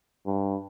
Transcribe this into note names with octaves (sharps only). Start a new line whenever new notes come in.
G2